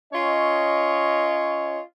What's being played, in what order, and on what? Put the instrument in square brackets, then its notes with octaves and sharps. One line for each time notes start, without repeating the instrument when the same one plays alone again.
[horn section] C#4 F4 C#5 D#5